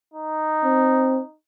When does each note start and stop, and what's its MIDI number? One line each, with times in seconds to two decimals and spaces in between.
0.14 1.36 63
0.65 1.20 60